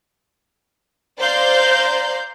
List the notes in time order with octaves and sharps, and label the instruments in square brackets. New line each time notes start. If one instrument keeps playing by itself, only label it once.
[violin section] C5 D5 F5 A#5 C6 G6